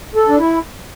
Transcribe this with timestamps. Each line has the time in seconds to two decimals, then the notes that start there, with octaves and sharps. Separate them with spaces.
0.15 A4
0.29 D4
0.38 E4